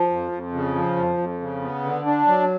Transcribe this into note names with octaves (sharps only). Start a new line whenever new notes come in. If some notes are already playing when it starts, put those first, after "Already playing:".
Already playing: F3
F2
F2
C#3
F3
F2
F2
C#3
B3
D3
D4
F#3